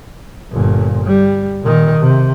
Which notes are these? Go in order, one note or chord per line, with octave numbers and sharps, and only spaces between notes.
G1 A#2
G3
A#2 D#3
C3